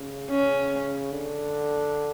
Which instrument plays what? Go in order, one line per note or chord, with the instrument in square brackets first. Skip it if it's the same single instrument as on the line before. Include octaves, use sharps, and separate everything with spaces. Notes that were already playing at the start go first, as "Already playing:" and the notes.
Already playing: [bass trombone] C#3
[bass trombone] C#3 [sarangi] C#4
[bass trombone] D3